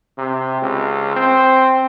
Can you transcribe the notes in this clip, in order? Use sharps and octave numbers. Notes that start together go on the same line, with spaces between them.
C3
C#2
C4